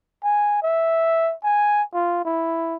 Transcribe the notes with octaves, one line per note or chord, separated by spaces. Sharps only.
G#5
E5
G#5
F4
E4